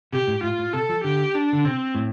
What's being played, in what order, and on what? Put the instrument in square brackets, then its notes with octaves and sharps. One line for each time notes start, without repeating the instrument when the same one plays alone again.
[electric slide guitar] C3 [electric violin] G4
[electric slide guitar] A2
[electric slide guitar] A2 [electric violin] F4
[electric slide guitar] A2
[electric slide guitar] C3 [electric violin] A4
[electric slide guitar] F3
[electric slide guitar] D3 [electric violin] G4
[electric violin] D4
[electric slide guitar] D3
[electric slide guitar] C3 [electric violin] C4
[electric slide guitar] A2